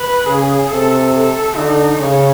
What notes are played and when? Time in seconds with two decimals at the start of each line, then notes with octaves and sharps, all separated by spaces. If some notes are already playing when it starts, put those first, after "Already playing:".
Already playing: B4
0.26 C#3 G#4
0.71 C3 A4
1.13 A4
1.56 D3 D#4
2.00 C#3 C#4